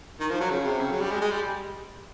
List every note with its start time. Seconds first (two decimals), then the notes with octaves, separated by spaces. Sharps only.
0.20 D#3
0.31 F3
0.40 F#3
0.50 C#3
0.65 C3
0.80 C#3
0.91 F#3
1.01 G3
1.11 G#3
1.21 G#3
1.31 G3